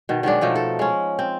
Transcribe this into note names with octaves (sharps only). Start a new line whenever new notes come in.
B2 D#3
D#3 F#3 G#3 D4
B2 F3 A3 D#4
A4
G#3 C#4
C4